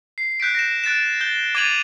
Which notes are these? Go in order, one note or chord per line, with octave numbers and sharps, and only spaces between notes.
C7
F#6 G6 B6 D7
A#6 E7
F#6 A6 D7 E7
G6 A6 G7
D6 G#6 A6 D#7 F7 F#7